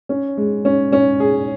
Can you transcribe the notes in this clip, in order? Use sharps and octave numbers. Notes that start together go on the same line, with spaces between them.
C#4
G#3
C#4
C#4
G#4